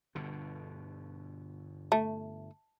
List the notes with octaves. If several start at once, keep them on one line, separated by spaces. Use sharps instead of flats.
G1 B2 D3
A3 A5